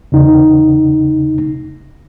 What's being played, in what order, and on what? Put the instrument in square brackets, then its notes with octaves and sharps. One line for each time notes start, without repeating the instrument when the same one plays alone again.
[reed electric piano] E2 C#3 D#4